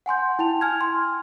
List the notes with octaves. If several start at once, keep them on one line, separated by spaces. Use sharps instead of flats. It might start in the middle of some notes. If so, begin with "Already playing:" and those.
F#5 G#5 C6 G6
E4 G5 A5 F7
G#5 F6 G#6
C6